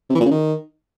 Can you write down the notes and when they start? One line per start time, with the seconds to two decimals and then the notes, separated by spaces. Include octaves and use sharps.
0.10 C3
0.15 E3
0.20 A#2
0.26 C#3
0.31 D#3